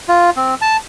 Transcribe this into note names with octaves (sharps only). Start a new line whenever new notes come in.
F4
C4
A5